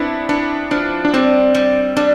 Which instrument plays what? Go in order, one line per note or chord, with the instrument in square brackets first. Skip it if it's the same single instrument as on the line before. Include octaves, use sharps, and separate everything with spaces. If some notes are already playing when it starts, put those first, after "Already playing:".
Already playing: [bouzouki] B3 [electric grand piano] C4 D4 E4
[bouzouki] B3 [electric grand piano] D4
[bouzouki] F3 [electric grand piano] D4
[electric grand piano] D4
[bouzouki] G3 [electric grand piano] C4
[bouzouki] G3
[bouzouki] G3 [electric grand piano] D4